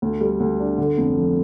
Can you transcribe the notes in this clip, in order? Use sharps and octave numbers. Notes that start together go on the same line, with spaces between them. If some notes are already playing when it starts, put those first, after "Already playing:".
D2
G3
D2
D4
D3
F1
F3